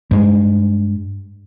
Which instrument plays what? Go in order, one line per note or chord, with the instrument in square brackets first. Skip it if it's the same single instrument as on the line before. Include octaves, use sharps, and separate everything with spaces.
[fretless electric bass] G2 G#3